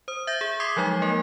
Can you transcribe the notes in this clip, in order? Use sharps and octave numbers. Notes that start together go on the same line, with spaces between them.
C5 D#6
E5 G6 A#6
G#4
C6 D6 D#6 G#6 B6 C7
F3 F#3 G#3 D#4
A#3 A#4